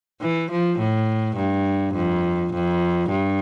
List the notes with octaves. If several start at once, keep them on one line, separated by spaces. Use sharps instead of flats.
E3
F3
A2
G2
F2
F2
G2